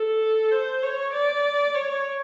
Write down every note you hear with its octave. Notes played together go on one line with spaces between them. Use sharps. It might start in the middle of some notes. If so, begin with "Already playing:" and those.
Already playing: A4
C5
C#5
D5
C#5